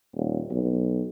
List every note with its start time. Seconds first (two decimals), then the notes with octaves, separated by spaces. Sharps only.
0.15 D#1
0.51 B1